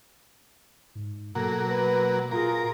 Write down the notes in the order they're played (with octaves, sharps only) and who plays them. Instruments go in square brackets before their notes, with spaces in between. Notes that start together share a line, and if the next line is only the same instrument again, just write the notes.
[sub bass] G#2
[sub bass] B2 [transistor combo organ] F#3 A#3 [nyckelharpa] A4
[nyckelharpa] B4
[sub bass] A#2 [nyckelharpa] F4 G#4 [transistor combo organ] A#4